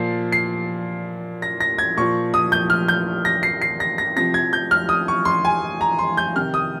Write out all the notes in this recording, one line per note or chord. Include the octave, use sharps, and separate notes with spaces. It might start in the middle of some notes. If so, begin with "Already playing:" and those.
Already playing: A#2 F3 C7
C7
A#6
A#6
G#6
A#2 F3 C#6
D#6
G6
F6
G6
A#6
C7
C7
A#6
A#6
C3 F3 A#6
G#6
G6
F6
D#6
C#6
C6
G#5
A#5
C6
G6
C3 D#3 F6
D#6